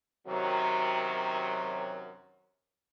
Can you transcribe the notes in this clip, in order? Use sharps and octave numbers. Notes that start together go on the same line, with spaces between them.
F#2 C3 D#3 F#3